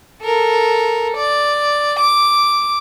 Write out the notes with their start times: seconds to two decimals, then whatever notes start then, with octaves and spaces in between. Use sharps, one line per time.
0.24 A4 A#4
1.17 D5
1.99 D6